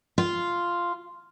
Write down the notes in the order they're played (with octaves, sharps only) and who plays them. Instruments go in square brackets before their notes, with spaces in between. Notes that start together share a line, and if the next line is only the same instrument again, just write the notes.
[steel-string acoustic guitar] F4